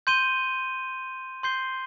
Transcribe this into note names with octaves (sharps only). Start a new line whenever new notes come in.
C6 G6 D#7 G7
C6 G6 C7 G7